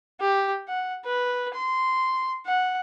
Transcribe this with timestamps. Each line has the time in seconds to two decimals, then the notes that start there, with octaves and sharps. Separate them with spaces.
0.20 G4
0.68 F#5
1.05 B4
1.54 C6
2.46 F#5